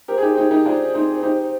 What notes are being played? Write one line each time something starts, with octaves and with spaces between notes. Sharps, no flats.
G4 A#4 C5
G#4
D#4 G4
C5
D#4 G4
D#4 G4 A#4
D4 F4 C5
C4 D#4
D#4 G4